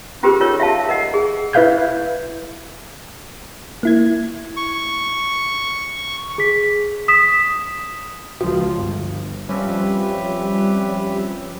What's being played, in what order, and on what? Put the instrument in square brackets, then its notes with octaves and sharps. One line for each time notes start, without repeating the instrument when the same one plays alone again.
[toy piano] C#4 F4 G4 G#4 A#4 C5
D#4 F4 A4 A#4 C#5
E5 F5 A5
A#4 D#5 F#5
G#4
[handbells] E4 B4 E5 F5 G6 G#6
[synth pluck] A#3 E4 G#6
[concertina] C#6
[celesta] G#4 B6
D#6 B6 E7
[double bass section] C#2 F3 [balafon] F#4
[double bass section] G1
[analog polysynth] F3 C4 C#4 [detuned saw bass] G3 [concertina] G4 B4 E5